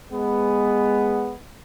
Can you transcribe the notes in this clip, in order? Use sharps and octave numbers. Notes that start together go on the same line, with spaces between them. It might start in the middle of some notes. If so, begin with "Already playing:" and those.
G#3 B3